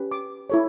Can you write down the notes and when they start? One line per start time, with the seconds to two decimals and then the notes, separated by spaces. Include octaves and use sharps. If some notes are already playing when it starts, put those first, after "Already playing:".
Already playing: C#4 G4 B4
0.11 D6
0.50 E4 A4 C#5